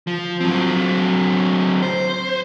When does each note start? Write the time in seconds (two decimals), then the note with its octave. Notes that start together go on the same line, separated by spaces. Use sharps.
0.07 F3
0.40 F#3 C4
1.83 C5